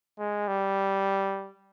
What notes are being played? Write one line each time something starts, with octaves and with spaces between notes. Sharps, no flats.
G#3
G3